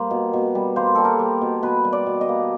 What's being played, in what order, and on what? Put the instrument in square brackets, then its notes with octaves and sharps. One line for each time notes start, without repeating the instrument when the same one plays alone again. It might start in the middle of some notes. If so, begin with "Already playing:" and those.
Already playing: [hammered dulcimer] G3 A#3 C5
B2
B2
G3
A#3 C5
G3 A4
A#4
G3
B2
B2 B4
G3
D5
B2
D#5
A#3